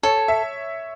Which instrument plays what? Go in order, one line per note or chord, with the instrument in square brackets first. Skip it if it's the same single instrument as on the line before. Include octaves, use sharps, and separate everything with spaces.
[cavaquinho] A4 [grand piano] C#5
[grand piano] E5